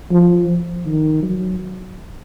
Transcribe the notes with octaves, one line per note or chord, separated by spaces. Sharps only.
F3
D#3
F#3